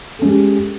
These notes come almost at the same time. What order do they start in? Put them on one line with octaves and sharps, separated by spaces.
A4 C#4 G#3 G4